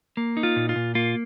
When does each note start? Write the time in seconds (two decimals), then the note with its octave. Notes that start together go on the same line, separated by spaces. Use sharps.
0.17 A#3
0.37 D#4
0.43 F4
0.56 A#2
0.69 F4
0.76 A#2
0.95 A#3 F4